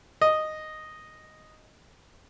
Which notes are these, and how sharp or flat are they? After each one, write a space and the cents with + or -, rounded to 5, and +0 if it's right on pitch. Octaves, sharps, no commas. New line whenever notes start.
D#5 -5